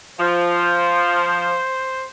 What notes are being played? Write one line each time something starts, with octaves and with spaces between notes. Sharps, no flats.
F3 C5